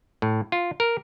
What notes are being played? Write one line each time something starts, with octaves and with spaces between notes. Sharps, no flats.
A2
F4
A#4